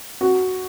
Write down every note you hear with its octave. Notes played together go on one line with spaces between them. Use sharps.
F#4